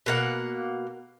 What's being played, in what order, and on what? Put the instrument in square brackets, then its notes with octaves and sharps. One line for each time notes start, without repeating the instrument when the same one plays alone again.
[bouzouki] B2 A#3 F#5